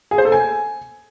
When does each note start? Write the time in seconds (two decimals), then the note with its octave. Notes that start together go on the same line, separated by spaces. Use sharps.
0.11 G#4
0.18 C5
0.25 A4
0.32 G#5